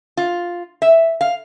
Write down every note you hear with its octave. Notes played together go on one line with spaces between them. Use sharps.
F4
E5
F5